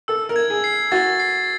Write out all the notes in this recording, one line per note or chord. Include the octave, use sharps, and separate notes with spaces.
A4 E6
A#4
G#6
G#4
C7
F#4 A6
C7